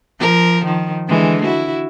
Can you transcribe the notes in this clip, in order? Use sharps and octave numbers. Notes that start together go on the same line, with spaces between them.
F3 A#4
D#3 F3
D3 E3 G#3
E4 F#4